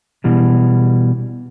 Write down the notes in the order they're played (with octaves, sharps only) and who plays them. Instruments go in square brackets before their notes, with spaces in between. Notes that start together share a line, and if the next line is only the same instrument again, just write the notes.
[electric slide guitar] B2 E3 G3